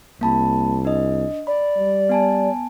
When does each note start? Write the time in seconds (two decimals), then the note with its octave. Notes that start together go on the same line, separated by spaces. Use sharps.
0.21 C2 A#3 A5 B5
0.85 D4 D#5
1.47 D5 B5
1.77 G3
2.09 B3 G#5 A5